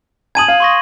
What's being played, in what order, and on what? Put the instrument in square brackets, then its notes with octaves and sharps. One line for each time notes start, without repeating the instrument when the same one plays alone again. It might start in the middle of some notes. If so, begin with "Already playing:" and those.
[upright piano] G#5 A5 D#6 [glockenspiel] G#6 D#7 F#7
[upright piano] F5
[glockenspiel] C6 C#6 A#6